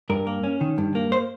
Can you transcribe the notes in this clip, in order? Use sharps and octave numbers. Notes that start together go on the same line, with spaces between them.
G2 A#4
A#3
C#4
D#3
G2
A#3
C5